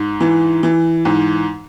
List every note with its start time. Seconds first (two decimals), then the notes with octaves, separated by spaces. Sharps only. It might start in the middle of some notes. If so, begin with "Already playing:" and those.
Already playing: G#2
0.20 E3
0.63 E3
1.05 G#2